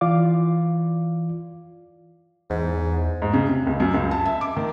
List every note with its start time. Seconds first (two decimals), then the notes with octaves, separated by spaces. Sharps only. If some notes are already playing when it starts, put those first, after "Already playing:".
0.01 E3 F4 D5 F5 D6
2.50 E2 G#2
3.22 G#2
3.33 C#3
3.46 C3
3.67 C#2
3.80 F#2
3.94 C#2
4.11 A5
4.26 E5
4.41 D6
4.57 D#3